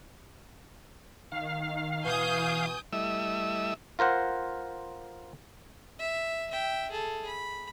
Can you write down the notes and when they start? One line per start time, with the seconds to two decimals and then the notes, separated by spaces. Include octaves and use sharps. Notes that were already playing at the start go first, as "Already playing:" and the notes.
1.32 D#3 F5
2.05 B2 E3 G#5 D#6 G6
2.93 G3 A3 E4 D#5 E5 E6
3.99 F4 A#4 C5 F#5
5.99 E5
6.51 E5 G5
6.91 G#4 A4
7.27 B5